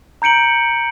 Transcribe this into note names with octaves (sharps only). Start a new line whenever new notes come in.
A#5 G6 C#7 D7 F#7